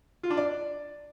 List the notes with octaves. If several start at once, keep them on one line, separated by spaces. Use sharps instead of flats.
F4
D4
D5